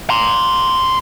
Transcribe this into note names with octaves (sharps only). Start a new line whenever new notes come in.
A#5 C6